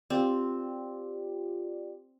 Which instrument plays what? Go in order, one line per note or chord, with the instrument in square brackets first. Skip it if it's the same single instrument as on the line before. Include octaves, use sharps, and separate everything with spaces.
[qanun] C4 [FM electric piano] F4 G4 D5